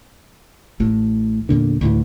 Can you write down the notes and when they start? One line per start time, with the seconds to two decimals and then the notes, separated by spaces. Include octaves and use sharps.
0.80 A1 A2
1.49 E2 A#2 D3
1.81 D2 A2 E3